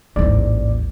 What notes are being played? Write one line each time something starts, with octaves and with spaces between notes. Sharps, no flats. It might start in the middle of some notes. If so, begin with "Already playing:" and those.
A1 D#2 G#2 D5